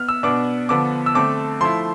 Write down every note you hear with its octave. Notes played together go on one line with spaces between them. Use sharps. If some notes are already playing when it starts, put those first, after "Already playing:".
Already playing: B3 F6
E6
B2 B3 D4 D6
D3 F3 B3 D6
E6
D3 A3 C4 D6
F3 A3 E4 C6